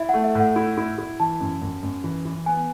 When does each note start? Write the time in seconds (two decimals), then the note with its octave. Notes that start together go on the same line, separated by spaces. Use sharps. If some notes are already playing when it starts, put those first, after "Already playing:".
Already playing: E4 E5
0.09 A3 F#5
0.24 E5
0.35 A2 F#5
0.56 E4
0.77 E4
0.98 E4
1.20 E3 A5
1.40 F#2
1.62 F#2
1.83 F#2
2.04 E3
2.25 E3
2.46 B3 G#5